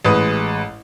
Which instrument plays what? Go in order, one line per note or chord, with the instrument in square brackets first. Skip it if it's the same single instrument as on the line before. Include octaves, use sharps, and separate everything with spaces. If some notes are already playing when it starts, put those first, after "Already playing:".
[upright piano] A1 G#3 B4 D#6